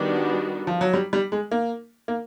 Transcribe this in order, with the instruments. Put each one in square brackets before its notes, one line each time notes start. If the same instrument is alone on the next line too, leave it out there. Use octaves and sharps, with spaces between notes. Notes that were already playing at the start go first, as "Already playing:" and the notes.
Already playing: [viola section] D#3 G3 B3 D4 F#4
[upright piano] F3
F#3
G3
G3
G#3
A#3
A#3